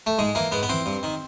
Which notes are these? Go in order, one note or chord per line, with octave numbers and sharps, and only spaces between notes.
A3
G#2 G#3
E3 A#3
G#2 B3
B3
E3 C4
G2
D#3